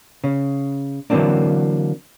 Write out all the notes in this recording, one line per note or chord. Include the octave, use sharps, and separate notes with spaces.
C#3
D3 E3 F#3 A#3 C4 D4